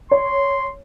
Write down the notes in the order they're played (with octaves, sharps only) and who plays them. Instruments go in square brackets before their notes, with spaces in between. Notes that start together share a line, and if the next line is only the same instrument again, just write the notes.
[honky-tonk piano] C#5 [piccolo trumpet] C6